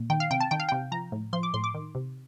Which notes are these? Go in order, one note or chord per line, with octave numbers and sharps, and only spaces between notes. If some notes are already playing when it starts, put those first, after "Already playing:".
Already playing: A#2
D#3 G5
F5
C3 G5
A5
D#3 G5
F5
C3 G5
F3 A#5
A2
F3 C6
D6
A2 C6
D6
D#3
C3